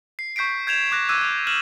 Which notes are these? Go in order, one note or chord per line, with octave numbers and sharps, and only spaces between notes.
C7
C#6 G6 B6 C7 D7
G6 G#6 E7 F7
D6 F#6 A#6
D6 E6 F#6 G#6 D#7
F6 G6 E7 F#7